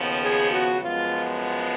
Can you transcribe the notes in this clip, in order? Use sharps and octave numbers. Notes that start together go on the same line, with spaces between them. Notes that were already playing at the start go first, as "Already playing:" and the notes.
Already playing: D#2 C#3 F3 B3
G#4
F#4
F#2 F3 G#3 B3 F4